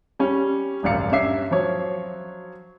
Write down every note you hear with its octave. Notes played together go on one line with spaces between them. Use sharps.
G3 C#4
D#1 G#1 F#2 D5 F5 C#7
G2 C#4 C#5 E5 D6 C7
F3 F#3 C#5